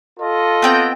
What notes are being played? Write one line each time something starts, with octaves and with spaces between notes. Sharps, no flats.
F4 A4 D#5
B3 C4 G5